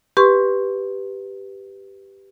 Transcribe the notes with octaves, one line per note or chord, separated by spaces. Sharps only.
G4 B4 C6 C#6